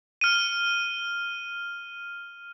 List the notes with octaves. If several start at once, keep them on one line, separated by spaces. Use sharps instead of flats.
F6 D#7